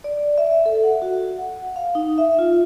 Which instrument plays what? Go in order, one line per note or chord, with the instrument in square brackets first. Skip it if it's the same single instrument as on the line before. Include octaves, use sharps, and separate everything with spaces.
[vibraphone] D5
E5
A4
F#5
F#4
F#5
F5
D#4
E5
F4